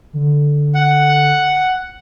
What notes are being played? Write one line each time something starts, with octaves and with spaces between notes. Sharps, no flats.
D3
F#5